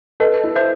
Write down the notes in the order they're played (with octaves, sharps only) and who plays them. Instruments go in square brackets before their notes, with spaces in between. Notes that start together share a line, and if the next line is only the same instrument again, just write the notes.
[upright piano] A4 [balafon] B4 D#5
[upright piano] E4
[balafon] C5 E5